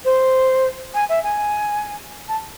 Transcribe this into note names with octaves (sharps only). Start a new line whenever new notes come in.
C5
G#5
E5
G#5
A5